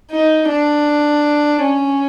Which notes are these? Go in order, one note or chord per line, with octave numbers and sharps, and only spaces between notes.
D#4
D4
C#4